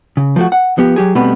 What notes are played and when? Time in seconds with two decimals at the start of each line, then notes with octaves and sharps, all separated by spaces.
0.17 C#3
0.36 F3 A3 F#4
0.52 F#5
0.78 F3 B3 G4
0.96 F#3 G4 G#4
1.15 B2 G3 A3 B3 C4 B4